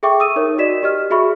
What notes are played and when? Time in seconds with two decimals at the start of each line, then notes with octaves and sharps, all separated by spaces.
0.03 G#4 A4 E5 G5 C#6 D6
0.20 D#6 E6 D#7
0.36 D#4 A#4 C#5
0.58 F#4 D5 D#5 B6 E7
0.83 G4 D#5 F6
1.10 F#4 G#4 E5 B5 C#6